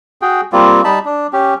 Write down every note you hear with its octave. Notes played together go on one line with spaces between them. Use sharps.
F#4 G#4 G5
G3 A#3 C4 F4
G3 D#4 A5 B5
D4
C#4 G4